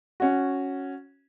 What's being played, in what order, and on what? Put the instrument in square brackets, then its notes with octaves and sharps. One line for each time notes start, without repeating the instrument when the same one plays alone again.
[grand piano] C#4 F#4